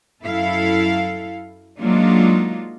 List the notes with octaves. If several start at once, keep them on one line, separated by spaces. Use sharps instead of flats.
F#2 F#3 E4 A4 F5
F#3 G#3 A#3 D4 D#4 F4